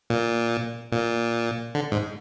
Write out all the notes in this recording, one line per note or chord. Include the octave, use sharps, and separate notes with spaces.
A#2
A#2
D3
G#2